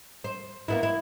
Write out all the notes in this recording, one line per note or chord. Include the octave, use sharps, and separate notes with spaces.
C5
A#3 B3 E4
E4